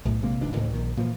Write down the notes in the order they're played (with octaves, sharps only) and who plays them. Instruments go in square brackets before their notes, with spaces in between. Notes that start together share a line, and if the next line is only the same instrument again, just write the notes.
[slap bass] B1 A2
A#1 C3 G#3 A#3
D1 C#2 E3 D4
D2 A2 C#3 E3
A#1 D#3
A#2 E3 F3